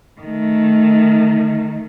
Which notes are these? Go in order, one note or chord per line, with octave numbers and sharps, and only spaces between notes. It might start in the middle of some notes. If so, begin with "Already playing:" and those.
D#3 A3